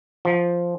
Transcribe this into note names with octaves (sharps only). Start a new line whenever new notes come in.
F3